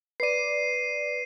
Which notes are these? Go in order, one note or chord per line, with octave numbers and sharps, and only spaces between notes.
B4 D5 C7 D#7